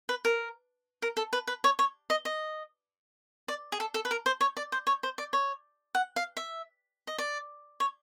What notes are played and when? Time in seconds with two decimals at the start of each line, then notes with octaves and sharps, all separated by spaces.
0.09 B4
0.25 A#4
1.02 A#4
1.17 A4
1.33 B4
1.47 B4
1.64 C#5
1.79 C#5
2.10 D#5
2.25 D#5
3.48 D5
3.72 G#4
3.80 A4
3.94 A4
4.05 B4
4.11 A#4
4.26 C5
4.41 C#5
4.57 D5
4.72 C5
4.87 C#5
5.03 C5
5.18 D5
5.33 C#5
5.95 F#5
6.16 F5
6.37 E5
7.07 D#5
7.18 D5
7.80 C#5